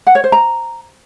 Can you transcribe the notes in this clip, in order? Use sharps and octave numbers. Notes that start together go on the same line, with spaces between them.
F#5
C#5
C5
A#5